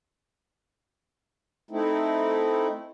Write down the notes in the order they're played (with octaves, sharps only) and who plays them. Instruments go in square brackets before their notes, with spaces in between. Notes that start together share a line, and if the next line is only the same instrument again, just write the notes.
[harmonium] A3 C4 D#4 E4